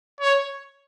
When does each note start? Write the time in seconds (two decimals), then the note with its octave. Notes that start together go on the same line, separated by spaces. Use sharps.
0.21 C#5